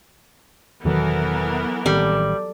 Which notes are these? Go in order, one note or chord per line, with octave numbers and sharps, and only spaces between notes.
E1 D#3 E3 F#3 B3 A4 A#4
A1 D#3 G3 C4 A4